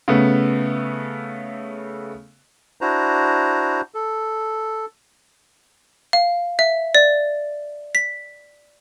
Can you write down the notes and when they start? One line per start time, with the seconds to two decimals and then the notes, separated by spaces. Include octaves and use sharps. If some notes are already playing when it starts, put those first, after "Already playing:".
0.08 C#3 A3 B3
2.81 D4 E4 F#4 C5 A#5
3.94 A4
6.13 F5
6.59 E5
6.95 D5
7.95 B6